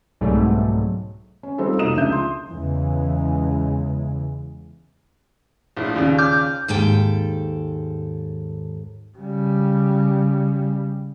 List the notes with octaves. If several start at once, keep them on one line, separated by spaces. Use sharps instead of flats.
C2 G#2 B2 F#3 G3 A3
C#4
G3 C4 D#4 F4 A4
F1 B2 A#3 D#4 D#6 E7
C#2 F3 D4 E5 G6
C6
E2 C#3 E3 G#3
A#1 A2
D#2 A#2 C#3
D6 F6 G6
D#2 G#2 A4 G5
C#3 G3